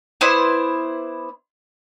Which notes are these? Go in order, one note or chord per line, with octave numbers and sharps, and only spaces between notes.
B3 E4 C5 D5